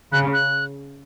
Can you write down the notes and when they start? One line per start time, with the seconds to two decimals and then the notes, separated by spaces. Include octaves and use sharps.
0.12 C#3 F#6
0.33 F#6